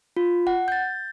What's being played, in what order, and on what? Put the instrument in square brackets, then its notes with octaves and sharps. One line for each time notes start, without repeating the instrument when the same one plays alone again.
[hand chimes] F4
F#5
G6 A6